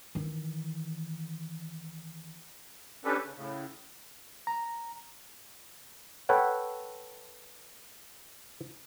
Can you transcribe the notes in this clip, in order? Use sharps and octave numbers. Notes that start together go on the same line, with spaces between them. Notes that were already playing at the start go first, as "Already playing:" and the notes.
D#3 E3
C#4 D4 G4 A4 B4
C#3
A2 C#3
A#5
A4 B4 C#5 F#5 G5